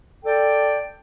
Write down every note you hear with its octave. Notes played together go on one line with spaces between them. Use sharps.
A4 D5 G5